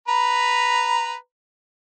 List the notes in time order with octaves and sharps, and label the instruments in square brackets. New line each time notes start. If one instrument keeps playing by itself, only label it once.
[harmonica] B4 A#5 B5